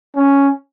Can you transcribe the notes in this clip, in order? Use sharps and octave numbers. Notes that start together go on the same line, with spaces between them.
C#4